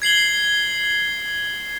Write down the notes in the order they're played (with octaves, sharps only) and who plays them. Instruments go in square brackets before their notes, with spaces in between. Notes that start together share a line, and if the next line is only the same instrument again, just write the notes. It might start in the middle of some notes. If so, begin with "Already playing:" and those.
[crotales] G#6 C7 F#7 G7